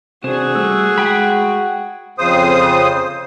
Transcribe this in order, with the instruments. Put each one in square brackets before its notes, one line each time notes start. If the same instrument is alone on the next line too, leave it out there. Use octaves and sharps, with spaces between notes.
[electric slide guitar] C3 C4 D4 [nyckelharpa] F#4 G#4 [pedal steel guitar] C5
[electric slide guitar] G3 A3 [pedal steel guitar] E6
[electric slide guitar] G#3 [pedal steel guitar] F#5 G5 B5
[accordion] F2 C#3 C5 D#6